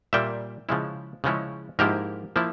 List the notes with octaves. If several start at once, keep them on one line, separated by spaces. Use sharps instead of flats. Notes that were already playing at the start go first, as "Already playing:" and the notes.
A#2 G3 A#3 E5 G5
C#3 F3 G#3 C#4 E4
C#3 F3 G#3 C#4 E4
G#2 F3 A#3 E4 G4 A#4
F3 A#3 E4